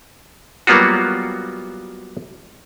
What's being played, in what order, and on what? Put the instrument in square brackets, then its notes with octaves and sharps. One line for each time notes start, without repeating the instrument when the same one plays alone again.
[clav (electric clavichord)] F#3 G3 A#3 B3 F4 F#4